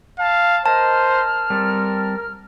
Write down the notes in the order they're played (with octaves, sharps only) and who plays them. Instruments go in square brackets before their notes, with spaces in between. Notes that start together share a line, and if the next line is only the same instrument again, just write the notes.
[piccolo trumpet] F5 [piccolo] A5
[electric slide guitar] A#4 D#5 [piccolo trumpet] C5 [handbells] A5 [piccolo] F6
[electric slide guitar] G3 C4 A4 [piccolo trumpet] A#4